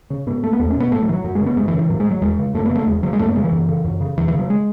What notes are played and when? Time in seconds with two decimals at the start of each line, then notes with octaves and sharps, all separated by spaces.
0.10 C#3
0.26 G#2 B3
0.44 A3
0.53 B3
0.60 E2 A3
0.70 C#4
0.76 B2 B3
0.92 G#2 A3
1.02 F#3
1.09 E3
1.13 F#3
1.24 F#2 F#3
1.35 G#3
1.41 C#3
1.46 B3
1.56 F#2 G#3
1.68 E3
1.73 C#3
1.79 E3
1.90 G#2 F#3
2.00 G#3
2.11 F#3
2.22 E2 G#3
2.39 C#3
2.54 F#2 A3
2.66 B3
2.70 C#3
2.76 A3
2.86 E2 G#3
3.03 C#3 F#3
3.13 G#3
3.19 F#2 A3
3.28 B3
3.36 C#3 G#3
3.44 E3
3.52 F#2
3.69 C#3
3.84 F#2
4.01 C#3
4.17 E2 E3
4.28 E3
4.33 C#3
4.39 F#3
4.50 G#3